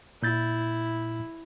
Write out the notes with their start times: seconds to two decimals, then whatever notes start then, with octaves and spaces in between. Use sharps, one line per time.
0.23 A#2 E4 G6 A6